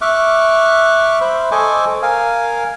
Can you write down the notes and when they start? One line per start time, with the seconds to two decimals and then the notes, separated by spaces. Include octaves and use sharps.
0.01 E5 C#6 D6 F6 F#6
1.21 C5 E5 B5
1.51 A4 C5 D#5 G#5 C#6 D6
2.02 A#4 F5 G#5